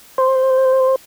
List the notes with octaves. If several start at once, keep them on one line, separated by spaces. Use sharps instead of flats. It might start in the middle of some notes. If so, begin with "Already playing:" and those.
C5